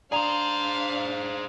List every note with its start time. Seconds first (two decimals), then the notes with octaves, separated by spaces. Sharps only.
0.12 D4 G#4 C5 D5 F5 A#5 F7